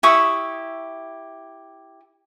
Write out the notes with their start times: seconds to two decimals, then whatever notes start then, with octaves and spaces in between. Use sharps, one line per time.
0.03 E4 G4 C#6 D#6